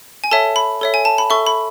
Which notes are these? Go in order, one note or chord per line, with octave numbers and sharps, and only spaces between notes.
G#5
A4 C#5 E5 A5
B5
A4 C#5 E5
G#5
A5
B5
A4 E5 C#6
B5